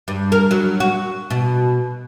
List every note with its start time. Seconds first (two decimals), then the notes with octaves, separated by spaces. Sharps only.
0.08 G2
0.32 A#4
0.51 F#3
0.80 F#4
1.30 B2